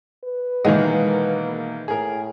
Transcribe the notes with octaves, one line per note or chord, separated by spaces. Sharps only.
B4
B2 D#3 E3 G#3 A#3 D#4 F#5
A2 G#4 A#4